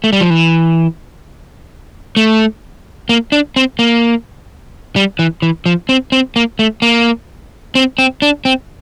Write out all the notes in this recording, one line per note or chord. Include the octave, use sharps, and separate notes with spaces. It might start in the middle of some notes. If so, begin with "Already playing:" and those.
A3
G3
F3
E3
A3
A#3
D4
C4
A#3
G3
E3
E3
F3
C4
C4
A#3
A3
A#3
C4
C4
D4
C4